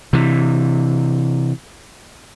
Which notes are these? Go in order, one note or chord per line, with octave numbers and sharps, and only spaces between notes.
C3 E3